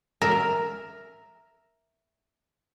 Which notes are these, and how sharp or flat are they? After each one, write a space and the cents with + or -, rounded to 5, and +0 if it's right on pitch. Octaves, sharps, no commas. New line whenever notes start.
A#4 +0 E5 +0 A#5 +0